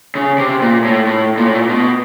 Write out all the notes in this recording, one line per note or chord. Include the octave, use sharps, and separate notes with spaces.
C#3
C3
A#2
A2
A2
A#2
A2
A#2
B2